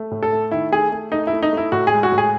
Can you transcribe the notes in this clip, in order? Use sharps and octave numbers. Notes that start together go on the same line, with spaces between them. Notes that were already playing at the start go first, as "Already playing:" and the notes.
Already playing: A3
A2
A4
A3
D#3 E4
A3 G#4
A3
A3 D#4
E4
A3
D#4
A3 E4
A2 F#4
G#4
G#3
F#4
A2
G#4